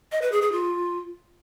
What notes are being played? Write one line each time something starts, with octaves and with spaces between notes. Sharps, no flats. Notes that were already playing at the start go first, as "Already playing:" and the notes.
D#5
B4
G#4
G#4
F4